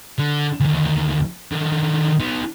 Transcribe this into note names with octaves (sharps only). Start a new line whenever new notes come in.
D3
D2 D#3
D3 D#3
B3 D#4